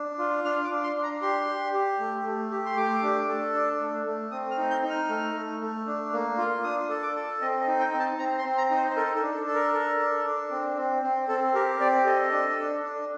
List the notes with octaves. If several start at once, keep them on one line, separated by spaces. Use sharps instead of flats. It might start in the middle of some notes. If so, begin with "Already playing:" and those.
Already playing: D4
F4
D4 F6
D6
D4
C6
D4
A#5
G4 C6
G4
G4
A3
A3
G4
C6
A3 D6
D4
A4
D4
A3
A3
C4 D#6
F6
D#4
G6
D#4
F6
A3
A3
A3
D4
A#3
F4
D4 D#6
A4
D6
A4
C4 D#5
D#5
D#4
G5
C4
A5
C4 A#5
C6
C4
A#5
D#4
C5
C5
A4 A#4
A4
D4
A4
A4
A#4
A4
D4
D4
C4
C4
C4
C4 A4
G4 A#4
C4 D5
A4 D#5
D4
D4
D4